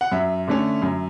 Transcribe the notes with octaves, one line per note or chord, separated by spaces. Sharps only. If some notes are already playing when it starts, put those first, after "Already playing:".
F#5
F#2 E5
D3 A3 C#4
F#2